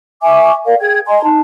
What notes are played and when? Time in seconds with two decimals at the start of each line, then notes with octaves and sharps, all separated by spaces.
0.22 E5 G#5 C#6 D6
0.65 A#4 D5 F5
0.80 G#4 G5 G#6
1.07 D#5 G#5 A#5 C6
1.23 D#4 A5